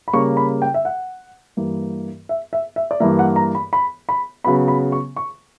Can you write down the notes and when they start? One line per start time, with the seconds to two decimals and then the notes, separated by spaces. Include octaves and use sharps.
0.08 B5
0.13 C#3 G3 A#3 C#6
0.37 B5
0.62 G5
0.74 E5
0.85 F#5
1.57 G2 E3 A#3
2.29 E5
2.53 E5
2.76 E5
2.91 D5
3.00 G2 E3 A#3 E5
3.19 F#5
3.36 A#5
3.55 B5
3.73 B5
4.09 B5
4.44 C#3 F#3 B3 B5
4.68 B5
4.92 C#6
5.16 C#6